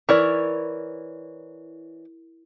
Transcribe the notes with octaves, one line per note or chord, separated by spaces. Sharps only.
E3 E4 A#4 C#5 D5